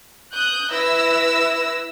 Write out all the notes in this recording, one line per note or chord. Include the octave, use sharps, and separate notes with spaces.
D#6 F#6 G6
E4 B4 E5 E6 A#6